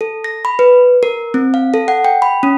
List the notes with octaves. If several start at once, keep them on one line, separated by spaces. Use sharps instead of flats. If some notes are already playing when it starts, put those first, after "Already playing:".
A4
A#6
B5
B4
A#4
C4
F5
A4
F#5
G5
B5
C#4